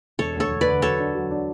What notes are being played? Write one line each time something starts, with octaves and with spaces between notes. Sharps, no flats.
E1 A4 C#5
D2
A4 C#5
E1
B4 D5
D3
F#3 A4 C#5
D4
F#3
D4